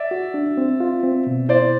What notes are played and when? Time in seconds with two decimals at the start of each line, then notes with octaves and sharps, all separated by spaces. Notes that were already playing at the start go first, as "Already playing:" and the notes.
Already playing: D5 E5
0.11 F#4
0.34 D4
0.57 C4
0.80 F4
1.03 C4
1.27 B2
1.49 E4 C5 D5